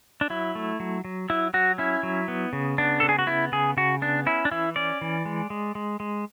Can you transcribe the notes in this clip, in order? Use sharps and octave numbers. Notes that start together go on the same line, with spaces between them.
D4
F#3 E4
A3
F#3
F#3
F#3 E4
F#3 F#4
C#4 E4
F#3
B3
C#3
B3 D4
C#3 A4
G#4
F#4
B3 E4
C#3 G#4
C#3 F#4
B3 D4
C#4 E4
D4
E3 E4
C#4 D5
E3
G#3
G#3
G#3
G#3